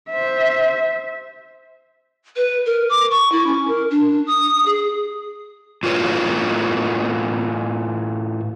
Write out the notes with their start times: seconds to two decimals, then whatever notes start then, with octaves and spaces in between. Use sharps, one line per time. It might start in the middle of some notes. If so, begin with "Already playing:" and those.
0.11 C5 E5
2.36 B4
2.66 A#4
2.89 D6
3.11 C#6
3.32 E4
3.46 C#4
3.68 A#4
3.91 D4
4.27 D#6
4.66 G#4
5.83 A2 F4 F#4 B4 C#5